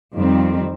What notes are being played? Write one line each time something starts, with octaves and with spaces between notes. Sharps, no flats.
F2 D#3 G3 C4